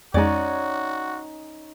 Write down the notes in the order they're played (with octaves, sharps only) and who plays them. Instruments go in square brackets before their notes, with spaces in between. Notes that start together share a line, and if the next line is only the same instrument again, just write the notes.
[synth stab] F2 G#3 [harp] C#4 D#4 [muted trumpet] F#4 [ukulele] D5